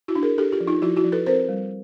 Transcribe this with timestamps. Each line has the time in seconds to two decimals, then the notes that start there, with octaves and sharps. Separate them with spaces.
0.08 E4 F#4
0.15 D4
0.23 G#4 A#4
0.38 D4 G4 A4
0.52 F4 G4
0.60 F3
0.68 D#4 F4
0.82 F3 E4 F#4
0.96 E4 F#4
1.04 F3
1.12 A4 B4
1.26 C4 A#4 C5
1.49 G3